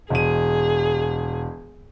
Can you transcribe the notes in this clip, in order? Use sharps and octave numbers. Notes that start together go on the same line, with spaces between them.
E1 G#4 D#7